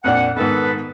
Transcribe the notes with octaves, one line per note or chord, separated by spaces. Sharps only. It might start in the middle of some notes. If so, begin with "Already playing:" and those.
F2 A#2 D4 F#5
G#2 D#3 B3 A4 B4